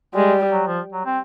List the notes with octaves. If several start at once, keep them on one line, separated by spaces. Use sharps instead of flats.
G3 G#3
F#3
F3
F#3
C4